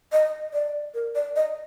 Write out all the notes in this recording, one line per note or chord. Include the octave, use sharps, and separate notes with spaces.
D#5
D5
A#4
D5
D#5